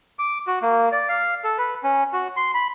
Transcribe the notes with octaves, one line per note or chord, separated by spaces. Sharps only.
D6
F#4
A#3
D5
F5
A4
B4
C#4
F#4
C6
B5